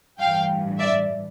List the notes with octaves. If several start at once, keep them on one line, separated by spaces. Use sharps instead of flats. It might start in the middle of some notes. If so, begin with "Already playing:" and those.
A1 G2 E3 F5 G5
D5 E5